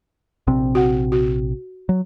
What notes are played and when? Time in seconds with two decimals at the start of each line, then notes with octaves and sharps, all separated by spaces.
0.47 A#1 C3 C4
0.75 F#4 F#5
1.12 F#4
1.89 F#3